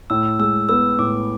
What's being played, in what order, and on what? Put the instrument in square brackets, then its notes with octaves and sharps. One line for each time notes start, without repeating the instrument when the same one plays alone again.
[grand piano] A2 [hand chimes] E6
[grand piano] G#3 [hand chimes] E6
[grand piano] B3 [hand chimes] E6
[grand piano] A2 [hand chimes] D6